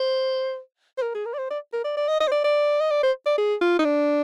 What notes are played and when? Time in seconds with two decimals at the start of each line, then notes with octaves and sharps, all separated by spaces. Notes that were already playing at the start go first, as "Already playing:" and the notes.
Already playing: C5
0.98 C5
1.02 A#4
1.14 G#4
1.26 A#4
1.33 D5
1.38 C5
1.50 D5
1.73 A#4
1.84 D5
1.97 D5
2.08 D#5
2.20 D#5
2.27 C5
2.32 D5
2.44 D5
2.80 D#5
2.90 D5
3.03 C5
3.26 D5
3.38 G#4
3.61 F4
3.79 D#4
3.85 D4